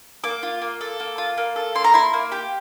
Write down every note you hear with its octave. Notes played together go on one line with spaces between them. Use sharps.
A#3 D6
F4
A#3
A4
A#3
F4
A#3
A4
A#3 C6
A#5
E4 C6
A#3
G4